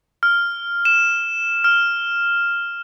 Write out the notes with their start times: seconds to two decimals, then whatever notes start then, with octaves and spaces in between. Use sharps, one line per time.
0.23 F6
0.85 E7
1.64 F6